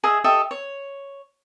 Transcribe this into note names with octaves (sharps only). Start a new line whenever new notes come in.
G#4 D#5 E5 F#5
G4 A4 D#5 E5
C#5